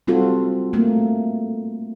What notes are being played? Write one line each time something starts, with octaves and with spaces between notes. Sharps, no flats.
G3 C4 F4 F#4 A4
A3 A#3